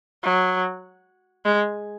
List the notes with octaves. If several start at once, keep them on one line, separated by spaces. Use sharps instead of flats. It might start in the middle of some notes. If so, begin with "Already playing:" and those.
F#3
G#3